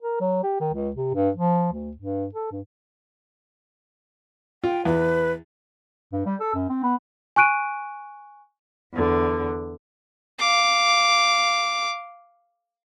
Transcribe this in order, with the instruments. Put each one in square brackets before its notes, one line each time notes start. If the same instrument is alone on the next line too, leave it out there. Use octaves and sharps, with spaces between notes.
[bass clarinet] A#4
F#3
G4
D#3
C#2
C3
G2
F3
D2
G2
A4
G2
[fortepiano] F4 [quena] G5
[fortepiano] E2 [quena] B4
[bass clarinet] G2
G3
A4
F#2
C4
B3
[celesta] G#5 C#6 F#6 D7 D#7
[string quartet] E2 D3
[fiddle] F5 D6